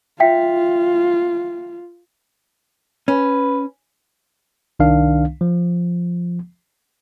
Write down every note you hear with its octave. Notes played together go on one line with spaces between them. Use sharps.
F4 E5 G5 B6
C#4 B4
C2 D#3 D4 F5
F3